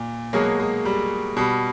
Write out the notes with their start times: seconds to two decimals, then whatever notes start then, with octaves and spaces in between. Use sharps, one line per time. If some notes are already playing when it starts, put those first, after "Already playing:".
Already playing: A#2
0.33 B2 F#3 G#3 A#3
0.59 G#3
0.85 G3
1.37 B2 G3